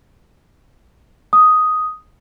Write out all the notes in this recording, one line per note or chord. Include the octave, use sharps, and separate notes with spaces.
D#6